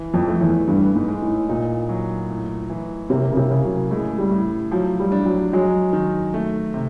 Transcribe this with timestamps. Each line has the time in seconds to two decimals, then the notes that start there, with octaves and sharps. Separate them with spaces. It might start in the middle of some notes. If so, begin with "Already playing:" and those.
Already playing: E3
0.14 F2
0.28 A3
0.41 E2
0.67 G2 E3
0.95 G#2
1.08 G#3
1.22 A2
1.49 A#2 D#4
1.89 F#3
2.30 A2
2.70 E3
3.10 C3 A#3
3.32 C#3
3.37 C3
3.51 C#3
3.64 F#3
3.91 A2 G#3
4.18 G3
4.31 A2
4.71 F3 F#3
5.00 G3
5.12 D4
5.26 F#3
5.53 F#3 G#3
5.93 D#3
6.34 A3
6.74 C3